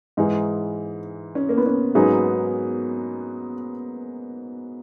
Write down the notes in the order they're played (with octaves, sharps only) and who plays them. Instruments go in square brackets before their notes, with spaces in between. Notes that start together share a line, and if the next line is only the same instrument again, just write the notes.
[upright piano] G#2 E3 G#3 [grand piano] D#4
[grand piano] C#4
A#3
B3
C#4
[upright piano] G#2 F#3 B3 D#4 G#4